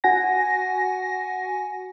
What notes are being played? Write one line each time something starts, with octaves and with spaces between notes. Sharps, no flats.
F#4 F#5 G#5 A#6